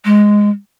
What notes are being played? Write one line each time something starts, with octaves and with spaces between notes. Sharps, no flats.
G#3